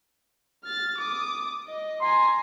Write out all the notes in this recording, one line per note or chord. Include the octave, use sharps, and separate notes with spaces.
F6 A6
D6 D#6
D#5
G#5 A#5 C6